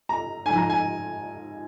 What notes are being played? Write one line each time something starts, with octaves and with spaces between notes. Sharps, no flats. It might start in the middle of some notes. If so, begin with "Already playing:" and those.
A#5
G#2 F3 G#5
A#5
G#5